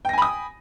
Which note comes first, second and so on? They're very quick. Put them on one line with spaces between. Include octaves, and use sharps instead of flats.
G5 A#6 G#5 B5 D#6